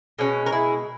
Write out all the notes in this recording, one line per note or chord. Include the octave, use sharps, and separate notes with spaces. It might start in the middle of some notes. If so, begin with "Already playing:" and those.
B2 G#3 C#4
A#4
E4 G#4